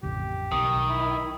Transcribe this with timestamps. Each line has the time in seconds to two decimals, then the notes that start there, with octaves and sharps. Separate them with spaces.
0.03 A1 F2 C#3 G4
0.52 B1 D#3 D#6
0.90 E4